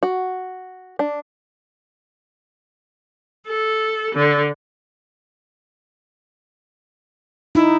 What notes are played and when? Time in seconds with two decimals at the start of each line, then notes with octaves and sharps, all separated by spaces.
0.03 F#4
0.99 D4
3.48 A4
4.15 D3
7.55 D#4 E4